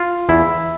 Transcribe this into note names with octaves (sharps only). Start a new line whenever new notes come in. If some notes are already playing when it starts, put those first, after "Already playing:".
Already playing: F4
E2 E4